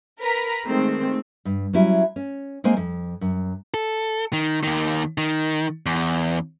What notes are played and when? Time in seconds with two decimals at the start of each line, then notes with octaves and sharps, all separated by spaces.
0.19 A#4 B4 A#5 B6
0.64 D#3 G#3 A3 C4
1.45 G2
1.73 F#3 G3 C#4 E4
2.16 C#4
2.64 G#3 A#3 C4 C5 D#5 G#5
2.77 F2
3.21 F#2
3.74 A4
4.33 D#3
4.63 D#2 D#3
5.18 D#3
5.86 E2